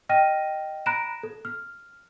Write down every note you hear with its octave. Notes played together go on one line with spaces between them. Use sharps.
D#5 G5 F6 A#6 D#7
A#5 B5 F#6 A#6 D7 E7
A4
F6